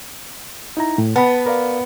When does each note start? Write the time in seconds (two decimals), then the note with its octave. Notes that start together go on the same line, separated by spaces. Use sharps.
0.77 D#4 E4 A#5
0.98 A2
1.16 B3 A5 B5
1.46 A#4 D5 F5